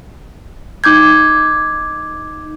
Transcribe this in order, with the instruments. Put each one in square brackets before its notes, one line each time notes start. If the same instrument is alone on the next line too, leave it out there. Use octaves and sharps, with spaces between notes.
[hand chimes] D#4 D6 G6 G#6